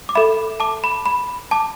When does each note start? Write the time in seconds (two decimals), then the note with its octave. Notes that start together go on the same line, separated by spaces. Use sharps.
0.09 D6
0.15 A4 E5 B5
0.60 A5 D6
0.84 B5
1.06 B5
1.51 A5 D6